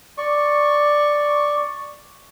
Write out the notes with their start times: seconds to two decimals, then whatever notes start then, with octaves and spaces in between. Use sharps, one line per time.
0.18 D5 C#6